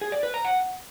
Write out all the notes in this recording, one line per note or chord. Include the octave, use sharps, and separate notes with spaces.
G#4
D5
B4
A#5
F#5